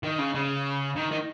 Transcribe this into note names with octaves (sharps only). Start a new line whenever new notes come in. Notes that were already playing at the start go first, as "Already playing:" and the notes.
D#3
C#3
C#3
D#3
D#3